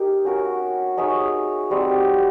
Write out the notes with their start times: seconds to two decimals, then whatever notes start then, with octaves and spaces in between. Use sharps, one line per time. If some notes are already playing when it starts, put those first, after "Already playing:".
Already playing: D#4 G4 A#4
0.25 C#4 F#4 A#4
0.97 D#4 G#4 C#5 E5
1.70 G3 C4 D#4 F#4